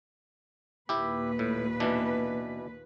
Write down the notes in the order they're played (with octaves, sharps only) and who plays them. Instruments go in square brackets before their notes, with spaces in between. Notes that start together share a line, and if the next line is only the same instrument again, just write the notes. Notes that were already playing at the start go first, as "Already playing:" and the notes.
[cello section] D#2 A#2 B4 [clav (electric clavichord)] E4 G4
[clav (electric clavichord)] A2
B2 E3 D4